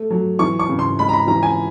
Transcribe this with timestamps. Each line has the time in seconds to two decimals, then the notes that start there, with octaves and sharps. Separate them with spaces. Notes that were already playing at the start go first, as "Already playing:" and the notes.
Already playing: A3
0.10 F#3
0.39 E3 C#6
0.59 C#6
0.69 C#3
0.79 C6
0.99 G#3 B5
1.09 A#5
1.13 B5
1.27 E3 A#5
1.43 G#5